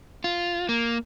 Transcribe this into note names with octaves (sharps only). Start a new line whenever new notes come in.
F4
A#3